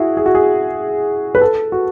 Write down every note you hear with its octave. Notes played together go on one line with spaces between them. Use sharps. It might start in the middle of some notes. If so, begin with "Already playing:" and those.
Already playing: E4 F#4 G#4
G#4
F#4
G#4
B4
A4
F#4